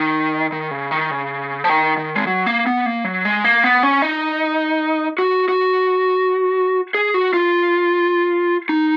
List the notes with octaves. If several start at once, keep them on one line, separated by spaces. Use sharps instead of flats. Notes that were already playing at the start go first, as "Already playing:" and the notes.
Already playing: D#3
D#3
C#3
D#3
C#3
F3
D#3
D#3
G#3
F#3
A#3
B3
A#3
F#3
G#3
A#3
B3
C#4
D#4
F#4
F#4
G#4
F#4
F4
D#4